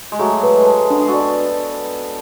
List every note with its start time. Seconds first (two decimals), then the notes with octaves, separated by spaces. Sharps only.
0.12 G#3
0.19 F#3 A3 G#4
0.43 B4
0.55 G#3
0.66 A5
0.90 G#3 B3 D4
1.01 G#4
1.08 F#4 A4
1.14 D5